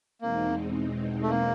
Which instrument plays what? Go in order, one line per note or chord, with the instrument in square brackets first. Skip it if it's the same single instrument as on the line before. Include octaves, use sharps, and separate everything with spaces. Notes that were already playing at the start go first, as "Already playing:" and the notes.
[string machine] E2 B2 G#3 C4 D#4 [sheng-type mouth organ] A#3
[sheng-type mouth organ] A3
A#3